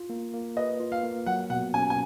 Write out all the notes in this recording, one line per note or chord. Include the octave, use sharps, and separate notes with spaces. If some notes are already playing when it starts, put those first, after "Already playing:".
Already playing: F4
A#3
A#3
B4 D#5
F4
F5
A#3
F#3 F#5
B2 F#5
C#4 G#5
G#5